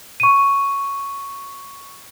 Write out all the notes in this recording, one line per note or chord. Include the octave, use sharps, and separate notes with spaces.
C#6 D#7